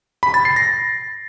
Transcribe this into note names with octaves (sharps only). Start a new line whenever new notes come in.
B5
A6
C7
A#6